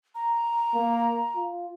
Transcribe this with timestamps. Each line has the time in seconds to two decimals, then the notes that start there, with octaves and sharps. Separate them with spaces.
0.15 A#5
0.74 A#3
1.35 F4